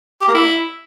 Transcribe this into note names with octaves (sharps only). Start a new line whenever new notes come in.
G4
A#3
E4